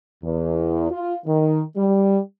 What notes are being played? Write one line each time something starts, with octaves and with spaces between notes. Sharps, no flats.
E2
F4
D#3
G3